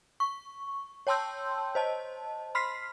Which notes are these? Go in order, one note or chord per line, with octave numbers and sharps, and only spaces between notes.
C#6
C#5 G5 A5 C6 E6 G6
C5 D#5 A5
B5 C6 F6 B6 C7